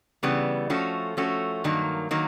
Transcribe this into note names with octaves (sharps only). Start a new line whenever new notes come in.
C#3 E3 G3 B3
F3 A3 C#4 F#4
F3 A3 C#4 F#4
G2 D#3 F#3 A#3
D#3 F#3 A#3